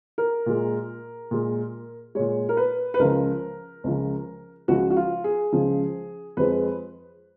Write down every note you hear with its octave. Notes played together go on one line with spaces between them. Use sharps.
A#4
A#2 G#3
A#2 G#3
A#2 G#3 C#5
A#4
B4
B4
C#2 C#3 F3 A#4
C#2 C#3 F3
C#2 C#3 F3 F#4
F#4
F4
G#4
C#2 C#3 F3
F2 F3 G#3 B4